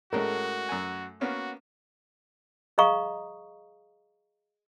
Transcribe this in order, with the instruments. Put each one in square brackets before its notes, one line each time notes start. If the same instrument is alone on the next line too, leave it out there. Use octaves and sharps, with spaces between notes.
[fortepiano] A2 G#3 C#4 [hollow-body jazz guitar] A3 A#4 [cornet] F#4
[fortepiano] F#2 F#5 G#5
[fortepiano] A#3 B3 C#4 [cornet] F#4
[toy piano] G#4 D#5 F5 A#5 C#6 D#6